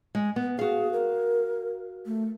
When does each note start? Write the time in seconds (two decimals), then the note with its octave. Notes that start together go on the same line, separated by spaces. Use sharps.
0.15 G#3
0.36 B3
0.59 F#4 G#4 F5
0.93 A#4
2.06 A3